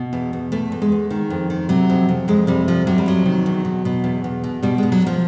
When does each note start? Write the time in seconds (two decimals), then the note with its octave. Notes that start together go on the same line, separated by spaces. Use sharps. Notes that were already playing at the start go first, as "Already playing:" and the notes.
Already playing: B2
0.13 E2
0.33 E2
0.52 E2 A3
0.72 E2
0.82 G#3
0.92 E2
1.10 D#3
1.30 F2
1.50 D#3
1.69 C3 F#3
1.90 F2
2.09 F2
2.28 F2 G#3
2.47 C3 G3
2.68 F2 F3
2.87 C3 F#3
2.98 G3
3.06 F2 F#3
3.26 D#3
3.46 E2
3.65 B2
3.85 B2
4.04 E2
4.24 E2
4.44 B2
4.63 B2 G3
4.78 B2 G#3
4.92 F#3
5.02 B2 F3